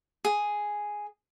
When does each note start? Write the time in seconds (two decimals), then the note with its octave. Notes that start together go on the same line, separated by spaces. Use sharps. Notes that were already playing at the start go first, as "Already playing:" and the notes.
0.24 G#4